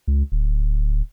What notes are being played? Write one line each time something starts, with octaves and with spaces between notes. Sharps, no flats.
C#2
D1